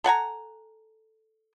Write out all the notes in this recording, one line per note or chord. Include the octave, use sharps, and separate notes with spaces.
A4 F#5 G#5 A#5